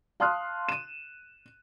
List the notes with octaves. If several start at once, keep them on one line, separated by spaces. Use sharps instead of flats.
F5 A5 C6 D#6 F6 F#6
D#7 E7